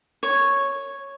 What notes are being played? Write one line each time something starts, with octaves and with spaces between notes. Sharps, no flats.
C#5